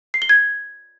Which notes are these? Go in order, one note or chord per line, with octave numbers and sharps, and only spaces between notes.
C7
G7
G#6